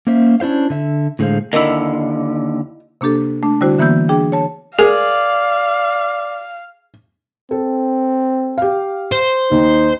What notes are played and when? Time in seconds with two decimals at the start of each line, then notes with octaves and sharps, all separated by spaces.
0.07 A#3 C#4 C5 E5
0.40 C#4 D4 E4 C5 F5
0.70 D3 E5
1.19 A2 D3 G#3 A#3 C5 F5
1.53 D#2 D3 E4 A#4 D#5
3.01 C3 A#3 D4 G4 A4
3.43 A3 D4
3.61 D3 G3 D4 E4 F#4 C5
3.79 D3 E3 A#3 B3 E6 G6
4.09 D4 G#4 G5
4.32 C#5 A5
4.79 G#4 A#4 D5 F5
7.51 C4 A4
8.58 G4 F5
9.12 C5
9.51 D#2 D#4